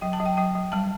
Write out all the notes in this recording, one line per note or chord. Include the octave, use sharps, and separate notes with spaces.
F#3 G5
A5
F#3
G5
F#3 G5
F#3
G3 A5